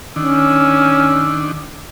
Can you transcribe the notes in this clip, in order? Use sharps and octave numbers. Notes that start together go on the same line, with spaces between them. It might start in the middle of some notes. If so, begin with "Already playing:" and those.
D#3 C#4 D4 E6